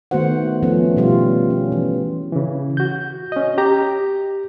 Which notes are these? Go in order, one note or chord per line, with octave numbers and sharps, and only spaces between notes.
D#3 A3 B3 F#4 C5 F#5
F3 A3 B3 C#4
B2 G3 F4 G4
C#4
E3
C#3 E3
F#4 G6
C#4 D#5
G4 A#5